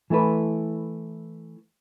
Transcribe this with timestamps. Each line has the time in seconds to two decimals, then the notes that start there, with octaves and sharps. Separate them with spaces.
0.10 E3 A3 E4 B4